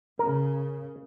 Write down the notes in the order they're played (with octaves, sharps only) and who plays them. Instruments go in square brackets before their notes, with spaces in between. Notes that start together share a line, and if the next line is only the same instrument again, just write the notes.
[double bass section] C#3 [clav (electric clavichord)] A#4